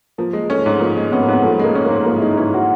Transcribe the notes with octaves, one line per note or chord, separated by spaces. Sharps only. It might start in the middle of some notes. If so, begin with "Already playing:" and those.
F3 A#3
G#3
A3 C#4
G#2
F3 A#3
G#3
B3 C#4
A#3
G#2
B3
F3 A3
G#3 A#3
C#4
G#2 A#3
F3 A#3
E4
G#3 D#4
C#4 E4
F#4